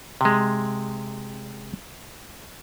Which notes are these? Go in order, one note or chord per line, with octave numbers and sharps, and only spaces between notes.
C3 G#3